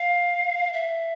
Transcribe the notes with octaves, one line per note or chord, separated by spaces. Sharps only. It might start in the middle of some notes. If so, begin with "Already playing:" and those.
Already playing: F5
E5